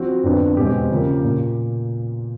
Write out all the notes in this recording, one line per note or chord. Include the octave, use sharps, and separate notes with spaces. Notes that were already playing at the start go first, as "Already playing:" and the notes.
Already playing: F3 C4 F#4
F2 D3 F#3 B3 D4
E2 B2 G#3 C4 G4
C#3 F3 A#3
A#2